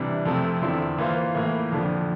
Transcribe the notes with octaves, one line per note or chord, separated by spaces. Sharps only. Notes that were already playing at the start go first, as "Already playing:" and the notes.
Already playing: C3 E3 G3 D4
F2 C3 F3 A3 C4
E2 D3 F3 C4 E4
E3 A#3 F4 C5 F5
A2 E3 A#3
F2 D3 F3